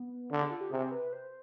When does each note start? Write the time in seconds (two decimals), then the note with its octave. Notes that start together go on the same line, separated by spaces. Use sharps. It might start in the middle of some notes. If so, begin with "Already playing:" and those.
Already playing: B3
0.31 D3 D4
0.41 G#4
0.51 F4
0.61 G4
0.71 C3 G#4
0.91 B4
1.13 C5